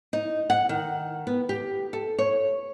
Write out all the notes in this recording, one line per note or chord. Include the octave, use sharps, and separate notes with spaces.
D#4
F#5
D#3
B3
G4
A4
C#5